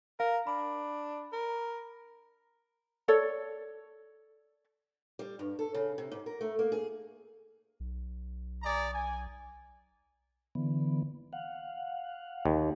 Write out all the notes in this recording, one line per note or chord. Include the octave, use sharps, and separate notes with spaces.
A#4 F5
D4 B5
A#4
A4 C#5 D5
G3
G2
A4
C#3
C3
G#2
A#4
A3
A#3
G#4
B1
G#4 D5 A#5
G#5
D3 E3 B3
F5 F#5
D#2